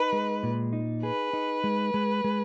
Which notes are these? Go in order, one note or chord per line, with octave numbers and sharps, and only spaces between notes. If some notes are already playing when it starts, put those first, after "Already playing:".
Already playing: D#4 B4
G#3
A#2
D#4
G#4 B4
D#4
G#3
G#3
G#3